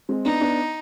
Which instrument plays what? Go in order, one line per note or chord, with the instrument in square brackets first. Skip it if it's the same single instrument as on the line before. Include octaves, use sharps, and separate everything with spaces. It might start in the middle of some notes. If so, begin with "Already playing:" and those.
[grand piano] G#3 C4
[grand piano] B3 D4 [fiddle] D#4
[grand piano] B3 D4